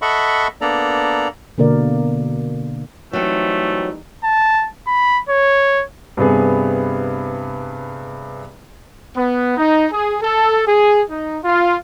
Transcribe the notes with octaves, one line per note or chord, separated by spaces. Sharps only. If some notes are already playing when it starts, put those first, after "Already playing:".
A4 D#5 E5 F#5 B5 C#6
A#3 B3 D4 A4 D5 A#5
B2 D3 A#3 A#4 D5
E3 F#3 G3 A3 C4 D#4
A5
B5
C#5
G2 C3 B3 G#4
B3
D#4
G#4
A4
G#4
D#4
F4